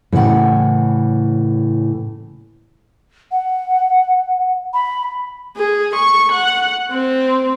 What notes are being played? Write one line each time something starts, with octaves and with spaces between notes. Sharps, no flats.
A2 C#3 E3 B4 F#5 G5
F#5
B5
G#4
C#6
F#5
C4